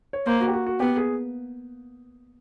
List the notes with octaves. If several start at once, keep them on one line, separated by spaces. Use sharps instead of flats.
C#5
A#3 C5
F#4
G4
F#4
F#4
B3 G4
G#4